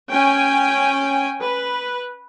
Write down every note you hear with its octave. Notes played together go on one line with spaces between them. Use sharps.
C#4 G5 G#5
B4